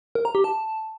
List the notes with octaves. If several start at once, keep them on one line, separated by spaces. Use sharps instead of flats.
A#4
A#5
G4
A5